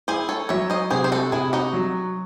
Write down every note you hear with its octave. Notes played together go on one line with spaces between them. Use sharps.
E4 G#4 C5
A4 C#5
F#3 C#5 E5
C5 D#5
C3 G#4 C5
C5
F#4 A4
C3 E4 G#4
D#4 F#4
F#3